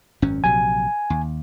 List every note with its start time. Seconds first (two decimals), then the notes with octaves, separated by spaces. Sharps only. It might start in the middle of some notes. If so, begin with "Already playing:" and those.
0.22 G#1 F#2 C#4
0.44 A#1 C3 F#3 G#5
1.10 D#2